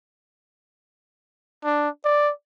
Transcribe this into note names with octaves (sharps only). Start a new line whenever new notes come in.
D4
D5